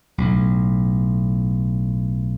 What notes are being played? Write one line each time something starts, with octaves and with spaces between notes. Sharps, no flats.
B1 A2